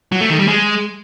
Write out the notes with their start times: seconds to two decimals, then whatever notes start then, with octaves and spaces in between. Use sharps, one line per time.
0.12 F#3
0.21 A3
0.30 D#3
0.39 G3
0.48 G#3